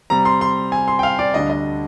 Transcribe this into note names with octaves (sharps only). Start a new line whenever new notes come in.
C3 G3 C4 A#5
C6
C6
G#5
C6
G5
F5
D5
D2 D3 G3 D4 D#5
D#5